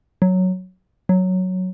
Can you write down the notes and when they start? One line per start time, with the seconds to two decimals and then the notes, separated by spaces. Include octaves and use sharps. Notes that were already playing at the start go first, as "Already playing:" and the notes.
0.22 F#3
1.09 F#3